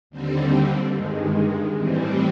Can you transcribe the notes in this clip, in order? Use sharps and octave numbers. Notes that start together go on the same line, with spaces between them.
D#2 D3 G3 C4
G2 D#3 G#3
A2 E3 G3 C4